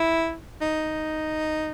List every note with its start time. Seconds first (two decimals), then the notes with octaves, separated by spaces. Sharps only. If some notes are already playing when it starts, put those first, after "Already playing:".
Already playing: E4
0.61 D#4